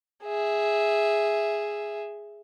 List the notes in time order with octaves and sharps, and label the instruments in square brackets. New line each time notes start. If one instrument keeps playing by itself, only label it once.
[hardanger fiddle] G#4 E5